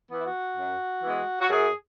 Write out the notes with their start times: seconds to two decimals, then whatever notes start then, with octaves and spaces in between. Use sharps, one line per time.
0.09 E3 B3
0.18 E4
0.25 F#4
0.56 F#2
1.03 E3 G#3 B3
1.41 F#4
1.50 F#2 G#4